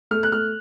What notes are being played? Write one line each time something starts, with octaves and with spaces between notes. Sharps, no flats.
A3 F6
F#6
A3 F6